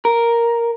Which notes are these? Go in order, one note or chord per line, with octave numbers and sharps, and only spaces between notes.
A#4